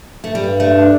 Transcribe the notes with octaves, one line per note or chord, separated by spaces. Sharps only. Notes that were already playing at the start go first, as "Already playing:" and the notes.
A3
G2 G3
A3
D4